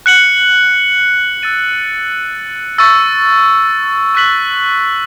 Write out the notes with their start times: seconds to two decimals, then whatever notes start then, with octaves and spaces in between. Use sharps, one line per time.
0.06 F#6 C#7 F#7
1.43 E6 A6 D#7
2.78 C#6 E6 A6
4.15 C#6 F#6 B6 F#7